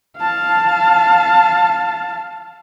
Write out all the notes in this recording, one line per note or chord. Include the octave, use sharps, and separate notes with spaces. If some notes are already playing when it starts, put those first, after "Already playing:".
F5 A5